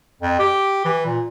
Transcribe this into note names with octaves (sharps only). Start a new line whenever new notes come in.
F2
G4
E3
A#2